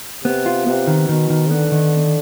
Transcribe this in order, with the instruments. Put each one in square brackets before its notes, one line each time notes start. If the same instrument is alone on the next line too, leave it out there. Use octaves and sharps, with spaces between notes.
[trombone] C3 [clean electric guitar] B3
[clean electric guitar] F4
[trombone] C3 [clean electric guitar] B3
[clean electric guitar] D#3
[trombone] B2 [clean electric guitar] D#3
[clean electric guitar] D#3
[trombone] D3 [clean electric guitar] B3
[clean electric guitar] D#3